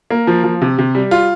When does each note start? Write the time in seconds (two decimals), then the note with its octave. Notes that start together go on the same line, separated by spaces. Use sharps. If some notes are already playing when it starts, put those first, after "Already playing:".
0.10 A#3
0.27 F3
0.44 F3
0.62 C3
0.78 C3
0.95 G3
1.11 F4